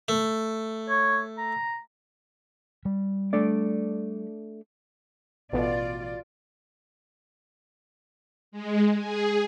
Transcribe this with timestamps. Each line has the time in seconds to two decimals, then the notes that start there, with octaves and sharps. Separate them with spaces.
0.08 A3
0.89 C#5
1.38 A#5
2.85 G3
3.33 A3 D4 D5
5.53 A1 B2 F4 D5
8.52 G#3
8.97 G#4